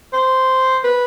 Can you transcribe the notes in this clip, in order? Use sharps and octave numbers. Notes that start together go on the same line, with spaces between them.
C5
B4